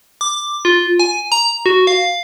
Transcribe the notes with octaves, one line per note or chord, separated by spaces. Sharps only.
D6
F4
G#5
A#5
F#4
F5